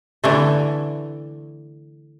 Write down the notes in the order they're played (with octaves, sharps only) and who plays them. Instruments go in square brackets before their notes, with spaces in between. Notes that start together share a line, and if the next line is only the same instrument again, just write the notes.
[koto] D3 E3 A3